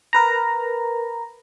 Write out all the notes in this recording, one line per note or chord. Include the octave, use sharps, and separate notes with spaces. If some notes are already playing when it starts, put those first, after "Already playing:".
A#4 B4 A#5